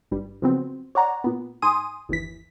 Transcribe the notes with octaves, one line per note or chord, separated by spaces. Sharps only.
G#1 G2 G3
C#3 F3 F#3 B3 C4
C#5 D5 F#5 A#5
A#2 B3
G#2 G#5 C6 D#6 D#7
G1 D#2 E3 B6